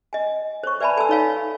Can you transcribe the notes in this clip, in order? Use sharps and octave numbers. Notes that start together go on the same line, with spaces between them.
D#5 G#5
C5 C#5 C#6
B4 D5 E5 G#5 A5 B5
A4 G#5 A5 C6 E6
D#4 A4 C#5 F5 G#5